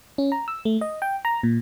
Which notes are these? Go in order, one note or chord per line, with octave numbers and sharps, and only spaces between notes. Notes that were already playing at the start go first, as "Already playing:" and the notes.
C#4
A#5
E6
A3
D#5
G5
A#5
A#2